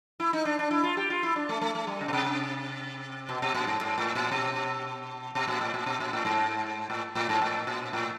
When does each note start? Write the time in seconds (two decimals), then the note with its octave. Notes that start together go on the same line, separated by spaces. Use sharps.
0.20 E4
0.33 D#4
0.45 D4
0.59 D4
0.71 E4
0.83 F4
0.97 G4
1.10 F4
1.23 E4
1.36 D4
1.49 A3
1.61 A3
1.75 A3
1.87 G3
2.01 C#3
2.08 B2
2.13 C3
3.29 B2
3.42 B2
3.54 A#2
3.67 G#2
3.81 G#2
3.98 A2
4.15 A#2
4.32 B2
5.35 B2
5.48 A#2
5.61 A2
5.74 A#2
5.86 B2
6.00 A#2
6.13 A2
6.25 G#2
6.90 A2
7.15 A2
7.29 G#2
7.42 A2
7.67 A#2
7.93 A2